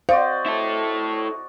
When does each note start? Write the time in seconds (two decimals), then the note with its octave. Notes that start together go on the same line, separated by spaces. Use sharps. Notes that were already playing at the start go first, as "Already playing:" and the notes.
0.09 F#4 C5 D5 D#5 F5
0.46 E4 A4